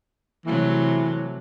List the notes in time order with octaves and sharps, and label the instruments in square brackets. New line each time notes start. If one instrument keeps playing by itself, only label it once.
[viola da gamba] C3 F#3 A3 [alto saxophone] E3